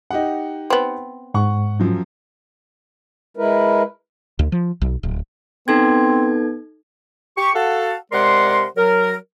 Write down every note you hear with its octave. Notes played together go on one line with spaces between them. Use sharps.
D#4 G4 F#5
B3 C4
G#2 F#5 C#6
F#2 F3 F#3
G#3 E4 A#4 B4
D2
F3
B1
D1
B3 C4 D#4 A4 G#6
G4 C#6
F#4 A4 F5 F#5 A5
C3 G#3 A#4 D5 F#5 C6
F#3 A#4